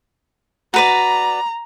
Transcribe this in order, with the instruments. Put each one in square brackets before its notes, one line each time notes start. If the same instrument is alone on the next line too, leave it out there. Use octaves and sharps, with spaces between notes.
[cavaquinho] F#4 B4 D5 [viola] A#5